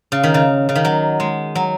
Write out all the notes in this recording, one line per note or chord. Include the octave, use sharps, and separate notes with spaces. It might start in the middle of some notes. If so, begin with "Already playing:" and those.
C#3
D#3
C#3
C#3
D#3
F#3
G#3
F#3